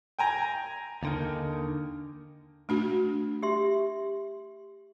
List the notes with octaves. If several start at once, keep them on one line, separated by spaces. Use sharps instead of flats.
G5 G#5 A#5
D#2 D3 D#3
A3 D4 F#4
G4 E5 C6